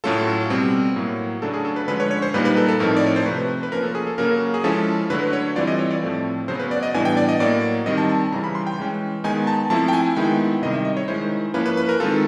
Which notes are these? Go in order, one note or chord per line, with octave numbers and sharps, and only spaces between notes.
A2 F#3 A3 C#4 F4 A4
B2 G3 C4
A2 F#3 A#3
C#3 F#3 A3 D4 A4
G#4
A4
B4
D3 F3 G#3 C#4 B4
C#5
C#5
C5
A#2 G3 A#3 D#4 B4
B4
A4
A4
A2 F3 A3 C4 D#4 A#4
D5
C#5
C5
C3 F3 A3 B4
B4
F3 A#3 C#4 F4 A#4
A4
G#4
A4
C#3 F#3 A#3 C#4 A#4
G#4
F3 G#3 C#4 E4 A4
D3 F#3 A3 B4
C#5
E3 G3 C4 F4 D5
D#5
C#5
D5
A2 F3 A3 C4
C#3 F#3 B3 C5
B4
D5
D#5
A2 E3 G3 B3 D4 G#5
G5
D5
D#5
A2 F#3 A#3 D5
D#3 G3 C4 D#5
A5
A5
A5
C#3 E3 G3 A#5
B5
C6
G5
E3 G#3 C#4
D#3 G#3 B3 D#4 G#5
A5
F3 A3 C4 E4 A5
G5
G#5
D#3 G#3 B3 E4 G5
C3 D#3 G3 D#5
E5
D#5
C#5
D#3 G#3 C#4 E4 C5
F3 A#3 C#4 E4 B4
B4
B4
A#4
D#3 G#3 C4 F4 A4